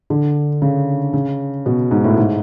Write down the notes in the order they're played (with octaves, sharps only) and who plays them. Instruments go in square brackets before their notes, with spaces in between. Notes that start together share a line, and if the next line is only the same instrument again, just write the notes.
[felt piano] D3
C#3
C#3
B2
G#2
A2
G#2